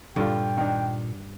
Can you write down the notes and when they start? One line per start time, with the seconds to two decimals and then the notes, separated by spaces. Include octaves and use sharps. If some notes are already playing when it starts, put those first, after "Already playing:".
0.16 G2 A#2 D3 F4 G5
0.57 D#3 D4